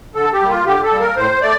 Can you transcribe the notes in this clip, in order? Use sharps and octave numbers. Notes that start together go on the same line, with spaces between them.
D3 A4
G4
G3 A#3
F4
D3 G4
A4
G3 A#3
A#4
A2 C5
A3 D5